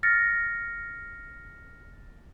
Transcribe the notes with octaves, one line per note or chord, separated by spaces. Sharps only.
F6 A6 A#6 C#7